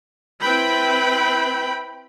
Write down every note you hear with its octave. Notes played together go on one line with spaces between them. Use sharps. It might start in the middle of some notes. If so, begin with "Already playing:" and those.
C4 E4 B4 G5 B5